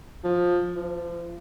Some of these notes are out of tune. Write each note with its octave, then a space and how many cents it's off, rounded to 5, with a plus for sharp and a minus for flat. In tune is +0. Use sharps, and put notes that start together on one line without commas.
F3 +15
F3 -35